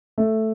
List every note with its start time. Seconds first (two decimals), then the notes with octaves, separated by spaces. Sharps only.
0.18 A3